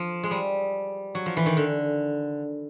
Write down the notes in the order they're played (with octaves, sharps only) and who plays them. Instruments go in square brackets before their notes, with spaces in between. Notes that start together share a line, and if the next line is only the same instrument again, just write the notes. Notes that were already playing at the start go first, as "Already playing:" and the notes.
Already playing: [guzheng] F3
G#3
G3
F#3
F3
E3
D#3
D3